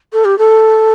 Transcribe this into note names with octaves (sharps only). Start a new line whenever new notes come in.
A4
G4
A4